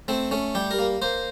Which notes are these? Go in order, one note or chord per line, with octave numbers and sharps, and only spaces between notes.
A3 C4
A3 C#4
G3 G4
A#4
A#3
A#3 C5